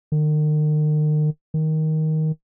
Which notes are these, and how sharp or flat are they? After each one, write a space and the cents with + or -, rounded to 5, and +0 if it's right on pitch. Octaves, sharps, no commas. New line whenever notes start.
D#3 -40
D#3 +10